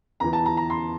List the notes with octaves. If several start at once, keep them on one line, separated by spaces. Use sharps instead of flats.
E2 E3 A#5
A5
A#5
A#5
C6